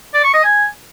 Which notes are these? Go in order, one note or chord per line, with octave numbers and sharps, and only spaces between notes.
D5
C#6
D#5
G#5